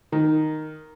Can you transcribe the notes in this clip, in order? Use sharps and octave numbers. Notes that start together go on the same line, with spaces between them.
D#3